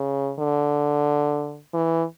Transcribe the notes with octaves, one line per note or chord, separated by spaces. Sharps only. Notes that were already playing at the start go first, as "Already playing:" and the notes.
Already playing: C#3
D3
E3